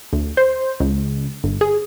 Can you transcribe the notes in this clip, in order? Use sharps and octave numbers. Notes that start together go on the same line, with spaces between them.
D2
C5
C#2
G1
G#4